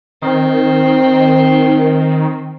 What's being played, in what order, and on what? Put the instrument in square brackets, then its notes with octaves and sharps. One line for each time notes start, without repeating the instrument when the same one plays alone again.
[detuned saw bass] D#3 [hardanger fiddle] C4